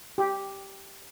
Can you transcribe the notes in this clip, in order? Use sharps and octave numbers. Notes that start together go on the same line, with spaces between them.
G4